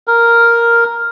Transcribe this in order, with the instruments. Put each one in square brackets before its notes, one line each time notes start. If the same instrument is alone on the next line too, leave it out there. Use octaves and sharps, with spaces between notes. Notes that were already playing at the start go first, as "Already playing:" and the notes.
[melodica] A#4